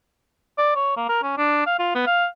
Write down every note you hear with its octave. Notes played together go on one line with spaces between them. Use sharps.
D5
C#5
A#3
A#4
C#4
D4
F5
F4
B3
F5